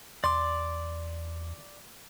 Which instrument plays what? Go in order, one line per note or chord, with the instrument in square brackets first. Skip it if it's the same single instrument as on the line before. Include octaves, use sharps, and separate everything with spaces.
[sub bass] E2 [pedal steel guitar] D5 D6 [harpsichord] C6